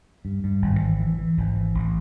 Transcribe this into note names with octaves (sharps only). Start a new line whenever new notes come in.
G2
G2
G#1
E3
E3
E3
G#1
E3
A1